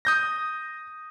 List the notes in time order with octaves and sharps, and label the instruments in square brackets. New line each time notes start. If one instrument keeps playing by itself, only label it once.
[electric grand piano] D#6 G6 A#6